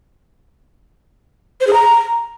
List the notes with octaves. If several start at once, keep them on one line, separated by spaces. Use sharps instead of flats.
C5
G#4
A#5